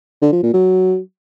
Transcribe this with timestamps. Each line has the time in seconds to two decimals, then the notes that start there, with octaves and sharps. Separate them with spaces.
0.22 D3
0.32 F3
0.43 A#2
0.53 F#3